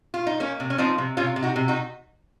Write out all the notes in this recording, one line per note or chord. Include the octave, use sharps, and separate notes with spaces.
F4
D#4
A#3 C#4
C3
C#4
F3 C4 D#4
C3
C3 C#4 F4
C3
D#4 F#4
C3
D#4 F#4